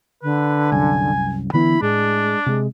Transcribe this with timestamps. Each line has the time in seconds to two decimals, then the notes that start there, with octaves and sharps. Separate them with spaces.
0.23 D3 B4
0.72 C2 F#2 G#5
1.53 D3 E3 B3 E4 B5
1.82 A2 G#3 D4
2.46 C3 G#3